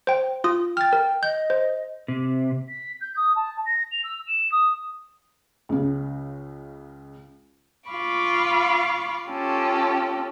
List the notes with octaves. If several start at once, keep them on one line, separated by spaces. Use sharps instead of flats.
C5 G5
F4 D#6
G5 F6 A6
A#4
D#5 G6
C5
C3
B6
G6
D#6
A5
A#6
F7
E6
E7
D#6
C#2 C#3
F4 F5 B5 C#6 D6
C#4 F4 G4 A4